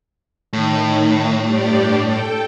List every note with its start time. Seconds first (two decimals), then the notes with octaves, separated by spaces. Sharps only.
0.53 A2 D#3
1.45 G2 G4 D5
2.04 A4 G5